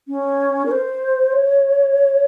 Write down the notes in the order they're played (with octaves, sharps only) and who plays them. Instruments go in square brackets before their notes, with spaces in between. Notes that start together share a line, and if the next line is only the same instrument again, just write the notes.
[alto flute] C#4
A#4
C5
C#5